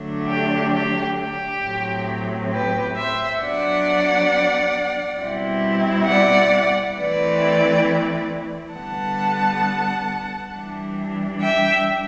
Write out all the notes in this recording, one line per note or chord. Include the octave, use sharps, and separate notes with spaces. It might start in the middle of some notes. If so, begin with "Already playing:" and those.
Already playing: D3 F#3 A3 D4
G4
G4
G4
A2 F#3 C4
G4 B4
C5 E5
F#3 B3 D4 D5 F#5
B2 G3 C4 E4
D5 F#5
E3 A3 C4 E4 B4 D5
D3 G3 B3 F#5 A5
E3 G3 D4
E5 G5